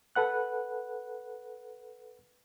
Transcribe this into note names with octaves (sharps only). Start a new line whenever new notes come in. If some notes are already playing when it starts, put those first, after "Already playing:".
A4 B4 F#5 F#6